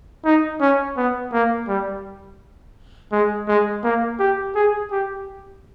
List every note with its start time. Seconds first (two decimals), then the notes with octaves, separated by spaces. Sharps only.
0.25 D#4
0.61 C#4
0.97 B3
1.33 A#3
1.68 G3
3.12 G#3
3.48 G#3
3.84 A#3
4.20 G4
4.55 G#4
4.91 G4